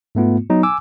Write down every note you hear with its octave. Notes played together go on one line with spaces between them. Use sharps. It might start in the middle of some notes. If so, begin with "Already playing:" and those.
G#2 A3 B3 F4
F#3 B3 D#4
G#5 D6 E6